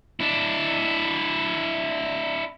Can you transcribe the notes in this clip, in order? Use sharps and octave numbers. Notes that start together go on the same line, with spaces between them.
D4 E4